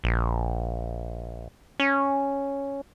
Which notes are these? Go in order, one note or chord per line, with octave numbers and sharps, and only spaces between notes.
A#1
C#4